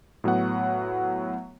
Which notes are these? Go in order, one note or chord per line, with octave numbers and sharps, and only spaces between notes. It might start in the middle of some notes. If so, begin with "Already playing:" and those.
A2 F#3 B3 F#5